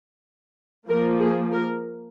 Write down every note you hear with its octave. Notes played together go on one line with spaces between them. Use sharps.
F3 A#3 A#4
G#4
A#4